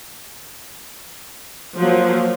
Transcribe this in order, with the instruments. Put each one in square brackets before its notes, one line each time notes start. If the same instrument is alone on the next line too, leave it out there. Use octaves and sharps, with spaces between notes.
[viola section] F3 F#3 A#3